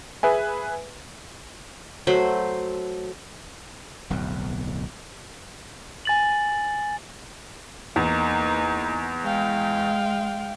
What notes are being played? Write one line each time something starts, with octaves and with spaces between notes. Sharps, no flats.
G#4 B4 E5 G#5
F#3 A3 C5 B5
D1 B1 F2
G#5 A6 F#7
E2 A#3 D#4
G#3 F5 G5